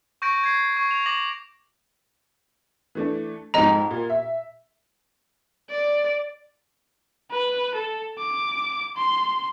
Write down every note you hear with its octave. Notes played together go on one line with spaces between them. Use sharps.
C#6 G6 A#6 D7
G#6 C7
C#6
F7
D6 A#6 F#7
E3 A3 D4
F2 G#2 D#5 A#5
A#2
E5
D5
B4
A4
D6
C6